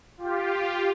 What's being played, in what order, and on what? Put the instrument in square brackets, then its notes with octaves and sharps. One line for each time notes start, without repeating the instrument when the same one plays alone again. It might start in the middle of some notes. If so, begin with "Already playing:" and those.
[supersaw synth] F4 G4